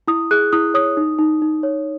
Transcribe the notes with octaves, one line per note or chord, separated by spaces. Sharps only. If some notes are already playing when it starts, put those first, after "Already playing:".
E4 D#6
G#4 F#6
E4 D#6
C#5 D#6
D#4
D#4
D#4
C#5